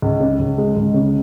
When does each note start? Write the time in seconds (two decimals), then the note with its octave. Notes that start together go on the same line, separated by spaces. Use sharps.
0.02 C#2
0.20 C#3
0.39 C#2
0.58 G#3
0.76 C#2
0.94 C#3